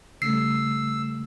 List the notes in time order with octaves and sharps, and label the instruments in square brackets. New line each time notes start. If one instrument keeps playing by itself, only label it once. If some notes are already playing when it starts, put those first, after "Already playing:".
[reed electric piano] C#3 G3 A3 [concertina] E6 [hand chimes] C7